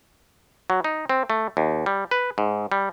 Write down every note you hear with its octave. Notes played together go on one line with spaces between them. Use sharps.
F#3
D#4
C4
A3
D#2
G3
B4
G#2
G3